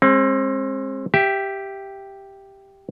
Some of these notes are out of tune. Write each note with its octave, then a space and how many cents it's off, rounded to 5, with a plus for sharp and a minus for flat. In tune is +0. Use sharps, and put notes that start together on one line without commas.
G#3 -10 C4 +35
G4 +0 E5 +10